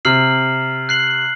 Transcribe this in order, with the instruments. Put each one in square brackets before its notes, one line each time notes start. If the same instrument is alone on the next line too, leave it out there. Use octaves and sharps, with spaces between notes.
[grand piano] C3 [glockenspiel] F6 C7 F#7
[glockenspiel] F#6 C7 F#7